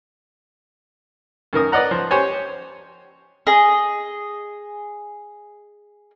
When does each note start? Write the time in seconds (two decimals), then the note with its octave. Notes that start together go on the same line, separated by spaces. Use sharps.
1.53 F#2 D#3 A#4 D#6
1.72 B4 D5 D#5 F#5 A#5
1.91 F3
2.11 G4 C5 C#5 G#5
3.47 G#4 D#5